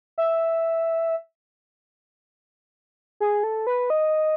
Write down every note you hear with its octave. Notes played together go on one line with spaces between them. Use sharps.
E5
G#4
A4
B4
D#5